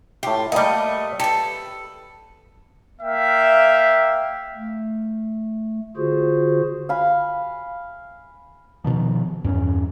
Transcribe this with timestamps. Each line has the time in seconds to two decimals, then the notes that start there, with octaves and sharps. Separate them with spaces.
0.23 A2 F4 G4
0.52 G3 A3 A#3 D#5
1.20 G4 A4 B4
3.01 A#3 E5 F5 G5
4.56 A3
5.97 D3 F4 F#4 G#4 C5
6.89 F5 G#5 B5
8.84 B2 D#3 F3
9.45 E2 G2 C#4